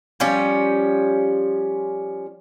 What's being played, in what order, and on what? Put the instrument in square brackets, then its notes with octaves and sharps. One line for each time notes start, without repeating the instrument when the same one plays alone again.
[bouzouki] F3 G3 C#4